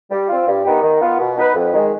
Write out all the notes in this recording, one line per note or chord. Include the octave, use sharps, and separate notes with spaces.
G3
C4 F4
G2
D#3 B3 D#4 G4
D#3
B3 F4
B2
B3 D#4 B4
F2
D#3 G#3